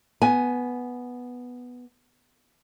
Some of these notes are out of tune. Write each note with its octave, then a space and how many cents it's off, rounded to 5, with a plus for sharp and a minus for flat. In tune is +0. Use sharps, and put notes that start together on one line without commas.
B3 +0 G#5 +10